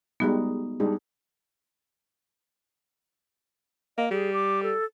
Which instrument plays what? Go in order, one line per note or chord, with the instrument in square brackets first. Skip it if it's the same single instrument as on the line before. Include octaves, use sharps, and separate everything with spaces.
[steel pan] G3 G#3 D#4 [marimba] B3 F#4
[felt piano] G3 D#4 G#4 [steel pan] D4
[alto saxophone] A#3 [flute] D#5
[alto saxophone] G3 [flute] G#4
[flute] D6
A4